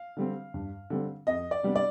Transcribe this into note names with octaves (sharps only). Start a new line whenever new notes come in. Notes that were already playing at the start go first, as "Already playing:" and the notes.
Already playing: F5
D3 G3 C4
G2
D3 G3 C4
F2 D#5
D5
C3 G3 B3 D4
D5